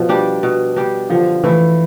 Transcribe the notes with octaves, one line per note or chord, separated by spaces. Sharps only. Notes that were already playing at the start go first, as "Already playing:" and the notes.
Already playing: B2 F3
G3 D4 G4
B2
G3 D4 G4
D3 F3
E3 A3 E4